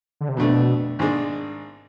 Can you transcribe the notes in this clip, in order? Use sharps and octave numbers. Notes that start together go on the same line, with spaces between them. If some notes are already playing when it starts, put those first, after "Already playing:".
D3
C3
F2 B2 D3 A3 D4
G#1 G#2 G#3 D4